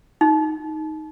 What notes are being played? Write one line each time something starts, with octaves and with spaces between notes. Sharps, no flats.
D#4